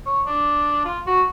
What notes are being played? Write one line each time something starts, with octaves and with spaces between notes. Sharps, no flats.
C#5
D4
F4
F#4